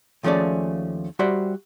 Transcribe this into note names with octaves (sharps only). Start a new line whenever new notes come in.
D#2 F3 A3 C#4 G#4 D5
G3 F#4 C5 D5 E5